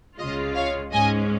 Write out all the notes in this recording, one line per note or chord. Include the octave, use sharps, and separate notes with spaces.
C#2 C#3 G#3 F4 D#5
C#5 F5
G#2 G#3 C#4 D#5 G#5